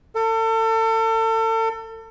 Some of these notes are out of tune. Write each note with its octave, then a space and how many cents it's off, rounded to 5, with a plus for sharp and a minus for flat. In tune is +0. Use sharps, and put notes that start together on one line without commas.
A4 +35